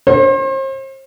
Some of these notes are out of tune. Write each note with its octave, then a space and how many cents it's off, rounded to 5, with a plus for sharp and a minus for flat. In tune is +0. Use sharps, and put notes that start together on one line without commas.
C5 +40